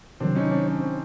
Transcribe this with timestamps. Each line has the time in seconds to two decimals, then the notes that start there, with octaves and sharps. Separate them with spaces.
0.20 C3 D#3 F#3 C4 D4
0.36 C#4 D#4
0.51 C4 D4
0.67 C#4
0.80 C4